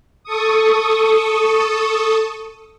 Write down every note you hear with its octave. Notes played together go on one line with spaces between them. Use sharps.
A4 C#6 D#6